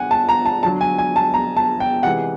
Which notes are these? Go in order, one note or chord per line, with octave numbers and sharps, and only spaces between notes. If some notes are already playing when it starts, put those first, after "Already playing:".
Already playing: D3 F#5 G#5
A5
A#5
A5
D3 F#3 A5
G#5
G#5
A5
A#5
A5
G5
C3 E3 G#3 F#5